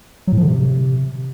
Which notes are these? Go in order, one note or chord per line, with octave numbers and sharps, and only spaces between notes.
F#3
A2
F3
D3
C3